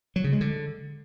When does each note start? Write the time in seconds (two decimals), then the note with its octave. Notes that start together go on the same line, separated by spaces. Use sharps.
0.16 F#3
0.24 C#3
0.32 G#3
0.41 D3